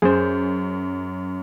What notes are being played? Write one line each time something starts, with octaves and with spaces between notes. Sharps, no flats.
F#2 G#4 C5